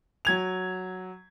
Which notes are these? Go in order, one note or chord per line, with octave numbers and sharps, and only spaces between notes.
F#3 G#6 F7